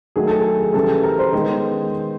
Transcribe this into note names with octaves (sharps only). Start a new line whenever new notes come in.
D#3 F#3 A3 G#4
A4
G#4
C#3 E3 G3 A4
A#4
C5
D#3 G#3 B3